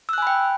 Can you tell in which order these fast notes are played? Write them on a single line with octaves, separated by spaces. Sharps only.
E6 F#6 G#5 B5 G5